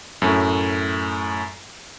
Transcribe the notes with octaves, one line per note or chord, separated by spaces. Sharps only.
F#2 A2 A3 C#4